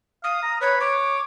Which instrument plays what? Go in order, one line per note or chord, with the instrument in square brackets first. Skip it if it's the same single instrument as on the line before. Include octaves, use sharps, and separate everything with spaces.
[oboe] F5 [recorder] D#6
[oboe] A#5
[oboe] B4 [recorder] C#5
[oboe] C#5 [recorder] D6